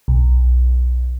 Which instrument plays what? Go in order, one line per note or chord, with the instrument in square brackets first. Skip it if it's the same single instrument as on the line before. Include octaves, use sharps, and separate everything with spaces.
[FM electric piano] B1